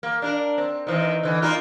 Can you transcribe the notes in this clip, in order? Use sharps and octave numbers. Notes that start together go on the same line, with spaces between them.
A#3
D4 A#4
C4
D#3 E3 C4
D3 E3
A#3 D#4 F4